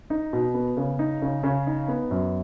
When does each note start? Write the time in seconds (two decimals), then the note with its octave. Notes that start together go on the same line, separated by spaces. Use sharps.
0.10 D#4
0.33 B2
0.54 B3
0.77 C#3
0.99 D#4
1.22 C#3
1.43 C#3
1.67 D#4
1.88 B3
2.11 F#2